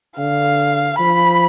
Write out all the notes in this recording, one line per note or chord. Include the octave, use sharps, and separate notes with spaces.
D3 F5
F3 B5